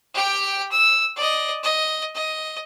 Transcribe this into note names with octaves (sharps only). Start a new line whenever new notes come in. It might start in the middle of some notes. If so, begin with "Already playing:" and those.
G4 G5
E6
D5 D#5
D#5
D#5